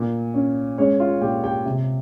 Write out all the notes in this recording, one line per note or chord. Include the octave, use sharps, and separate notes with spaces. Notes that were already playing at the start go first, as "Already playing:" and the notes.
Already playing: A#2
C#4
G#3 C#4 C#5
F4 F5
A#2 G4 G5
G4 G5
C3